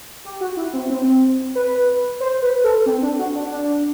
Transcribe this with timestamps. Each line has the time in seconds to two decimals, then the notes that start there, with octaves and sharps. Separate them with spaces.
0.25 G4
0.41 F#4
0.57 E4
0.73 C4
0.90 C4
1.55 B4
2.20 C5
2.42 B4
2.64 A4
2.86 C4
3.02 D4
3.19 F#4
3.35 D4
3.51 D4